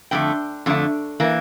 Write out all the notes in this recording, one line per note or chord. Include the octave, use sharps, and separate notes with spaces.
F2 D3 A3 G5
F2 D3 A3
E3 A#3